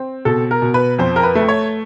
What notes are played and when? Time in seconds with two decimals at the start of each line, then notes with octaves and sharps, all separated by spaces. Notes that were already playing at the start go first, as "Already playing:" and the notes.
Already playing: C4
0.25 B2 A4
0.51 A#4
0.62 B2
0.74 B4
0.99 F2 C5
1.16 A#4
1.23 B4
1.35 A3
1.48 C#5